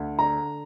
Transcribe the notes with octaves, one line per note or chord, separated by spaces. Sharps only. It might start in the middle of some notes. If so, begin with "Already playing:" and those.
Already playing: D2
D3 A#5